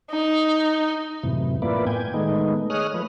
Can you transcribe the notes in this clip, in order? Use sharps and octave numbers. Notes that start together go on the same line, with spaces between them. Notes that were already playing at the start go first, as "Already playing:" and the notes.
D#4
F#2 A2 C3 E3
A#3 B3 E4 F4 B4 D5
A2 G5 G#5
D#3 G#3 A3 B3 D#4
G#4 C#5 D#5 D#6 F6 F#6
F3 A3 B4